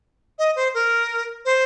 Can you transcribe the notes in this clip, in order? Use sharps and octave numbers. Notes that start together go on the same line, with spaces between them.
D#5
C5
A#4
C5